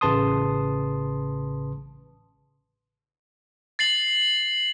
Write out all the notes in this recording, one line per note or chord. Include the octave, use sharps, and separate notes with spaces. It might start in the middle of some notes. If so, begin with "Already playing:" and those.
A1 C#3 B4 A5 C6 D#6
A6 C7 F#7